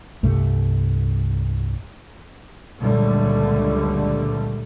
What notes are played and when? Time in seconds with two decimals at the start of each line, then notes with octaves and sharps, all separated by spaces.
0.23 C2 G2 A3
2.80 C#2 F#2 A#2 D3 G3 A3